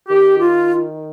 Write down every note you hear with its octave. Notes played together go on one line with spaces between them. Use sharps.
D#3 G4
F4